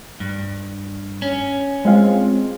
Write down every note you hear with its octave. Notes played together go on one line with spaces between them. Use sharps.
G2
C#4
G#3 C4 F4